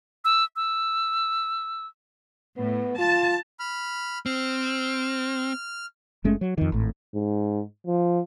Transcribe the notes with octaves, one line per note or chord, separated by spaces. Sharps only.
E6
E6
A2 B3
F4 A5
B5 F6
C4 F6
F#1 G#3 A3 C#4
F#3
F2 D#3
G#1 A2
G#2
F3